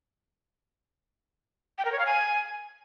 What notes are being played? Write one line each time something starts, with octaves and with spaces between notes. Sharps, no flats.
G5
A#4
C#5
F5
G#5